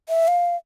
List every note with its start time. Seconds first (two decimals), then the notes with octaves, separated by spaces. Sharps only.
0.09 E5
0.28 F5